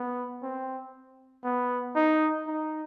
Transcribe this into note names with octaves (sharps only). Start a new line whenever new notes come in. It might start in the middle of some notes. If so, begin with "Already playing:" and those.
Already playing: B3
C4
B3
D#4
D#4